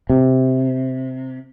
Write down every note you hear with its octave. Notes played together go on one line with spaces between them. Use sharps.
C3